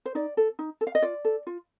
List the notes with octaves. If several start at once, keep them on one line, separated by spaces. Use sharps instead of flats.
C5
D#4 D5
A4
D#4
A4
F5
D#5
F4 D5
A4
F4